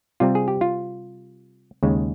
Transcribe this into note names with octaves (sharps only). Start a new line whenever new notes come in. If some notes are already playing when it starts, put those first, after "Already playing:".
C3 G3 C4 F4
G#4
G4
F4
D#2 C#3 G#3